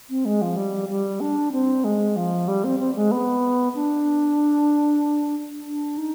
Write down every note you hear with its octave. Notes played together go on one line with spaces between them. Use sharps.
C4
G#3
F3
G3
G3
D4
C4
G#3
F3
G3
C4
C4
G#3
B3
D4
D4
D#4